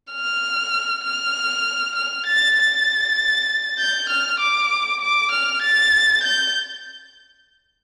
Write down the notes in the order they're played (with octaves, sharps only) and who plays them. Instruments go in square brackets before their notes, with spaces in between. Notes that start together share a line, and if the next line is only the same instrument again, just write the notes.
[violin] F6
F6
F6
A6
A6
G6
F6
D6
D6
F6
A6
G6